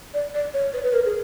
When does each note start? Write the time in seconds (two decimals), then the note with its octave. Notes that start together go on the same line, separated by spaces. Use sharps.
0.14 D5
0.34 D5
0.54 C#5
0.74 B4
0.84 B4
0.93 A#4
1.05 G#4